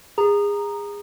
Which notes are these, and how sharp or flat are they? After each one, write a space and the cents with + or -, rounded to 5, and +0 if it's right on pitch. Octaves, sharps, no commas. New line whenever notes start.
G#4 -25 A#5 +0